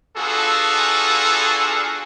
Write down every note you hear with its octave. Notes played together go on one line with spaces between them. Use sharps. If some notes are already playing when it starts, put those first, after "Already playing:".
B3 D4 F4 F#4 G#4 A4